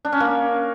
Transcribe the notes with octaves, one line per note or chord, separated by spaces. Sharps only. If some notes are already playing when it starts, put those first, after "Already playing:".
D4
C#4
A#3